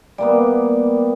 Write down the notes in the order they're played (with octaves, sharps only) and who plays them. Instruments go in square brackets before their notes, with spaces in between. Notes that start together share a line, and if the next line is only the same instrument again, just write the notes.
[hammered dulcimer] G3 A#3 B3 [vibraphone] D5